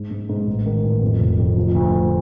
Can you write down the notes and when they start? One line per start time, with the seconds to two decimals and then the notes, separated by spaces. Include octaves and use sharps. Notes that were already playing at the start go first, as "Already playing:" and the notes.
Already playing: G#2
0.11 G#2
0.29 G#2
0.47 A1
0.66 D#3
0.84 A1
1.02 F2
1.20 F1
1.38 F2
1.56 F3
1.75 D2
1.93 D2